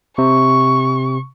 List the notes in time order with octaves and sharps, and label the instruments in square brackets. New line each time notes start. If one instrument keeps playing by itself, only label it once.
[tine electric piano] C3 [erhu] C#6